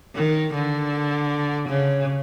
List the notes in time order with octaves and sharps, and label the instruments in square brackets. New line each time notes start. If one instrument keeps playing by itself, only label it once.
[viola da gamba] D#3
D3
C#3